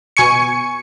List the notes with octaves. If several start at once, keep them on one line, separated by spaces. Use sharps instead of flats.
B2 G#5 C#6 C#7